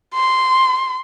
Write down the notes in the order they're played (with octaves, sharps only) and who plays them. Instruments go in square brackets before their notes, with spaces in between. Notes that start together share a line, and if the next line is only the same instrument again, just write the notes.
[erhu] C6